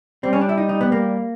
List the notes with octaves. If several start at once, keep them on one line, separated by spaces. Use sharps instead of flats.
G3 C4
C#4
D4
E4
D#4
D#4
B3
A#3